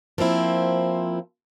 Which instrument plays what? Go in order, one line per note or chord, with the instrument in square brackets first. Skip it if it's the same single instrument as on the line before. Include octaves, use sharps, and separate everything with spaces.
[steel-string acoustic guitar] F3 A#3 C4 E4